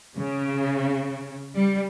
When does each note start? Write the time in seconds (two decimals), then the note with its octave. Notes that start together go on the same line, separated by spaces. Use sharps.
0.17 C#3
1.55 G3